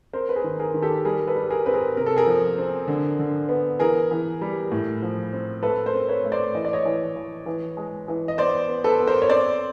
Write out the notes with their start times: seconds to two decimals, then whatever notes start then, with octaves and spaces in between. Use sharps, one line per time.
0.13 C4 A#4 C5
0.29 B4
0.36 G#4 A#4
0.44 D#3
0.59 G#4 A#4
0.74 D#3
0.82 G4 A4
1.05 G3 G#4 A#4
1.27 A4 B4
1.35 G3
1.50 G#4 A#4
1.66 C4 B4
1.74 G#4 A#4
1.97 C3 A#4
2.06 A4
2.16 G#4 A#4
2.27 F3
2.58 C4
2.88 D3
3.19 D3
3.49 B3
3.79 E3 G#4 A#4
4.11 E3
4.41 G3
4.72 A2
5.02 F3
5.33 C4
5.63 A3 A4 B4
5.86 A#4 C5
5.94 C4
6.09 B4 C#5
6.24 A3
6.32 C5 D5
6.55 E3 D#5
6.65 D5
6.73 C#5 D#5
6.85 E3
7.16 E3
7.46 E3
7.77 G#3
8.08 E3
8.28 D#5
8.38 B3 C5 D5
8.69 B3
8.84 A4 B4
8.99 B3
9.07 A#4 C5
9.22 C#5
9.29 C4 C5 D5